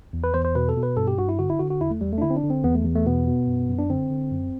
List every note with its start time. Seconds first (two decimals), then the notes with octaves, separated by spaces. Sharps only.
0.13 E2
0.24 B4
0.34 E2 C5
0.45 C5
0.55 B2 B4
0.69 A4
0.77 B2
0.83 B4
0.97 G2 A4
1.07 G4
1.17 G2 F#4
1.29 E4
1.39 D3 F#4
1.50 E4
1.59 D3 F#4
1.70 F#4
1.80 E2 E4
1.91 A3
2.01 E2 G3
2.12 A3
2.18 D4
2.22 D3 E4
2.30 C4
2.36 D4
2.43 D3
2.50 C4
2.64 E2 B3
2.75 A3
2.85 E2
2.96 A3
3.06 B2 B3
3.27 B2
3.47 F#2
3.69 F#2
3.79 D4
3.90 D3 C4
4.10 D3
4.32 F#2